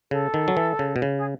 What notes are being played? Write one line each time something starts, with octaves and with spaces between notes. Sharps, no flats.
C#3 A4
D#3
F#3
E3
C#3
B2
C#3
G#4